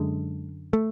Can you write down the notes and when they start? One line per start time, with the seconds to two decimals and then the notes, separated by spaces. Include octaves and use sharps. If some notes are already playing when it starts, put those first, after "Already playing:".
Already playing: F#2 D3 G#3
0.73 A3